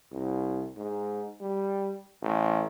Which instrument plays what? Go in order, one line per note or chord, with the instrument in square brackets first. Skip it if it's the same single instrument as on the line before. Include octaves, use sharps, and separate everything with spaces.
[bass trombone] C2
G#2
G3
A1